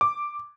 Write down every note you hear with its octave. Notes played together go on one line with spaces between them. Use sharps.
D6